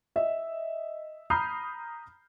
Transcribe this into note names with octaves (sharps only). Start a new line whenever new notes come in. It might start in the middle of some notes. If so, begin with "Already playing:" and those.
D#5 E5
A#5 B5 D#6 F6 G6 C7